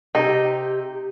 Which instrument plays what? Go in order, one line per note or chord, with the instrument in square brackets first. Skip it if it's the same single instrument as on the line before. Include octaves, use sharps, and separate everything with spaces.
[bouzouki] C3 G4 [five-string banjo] D#4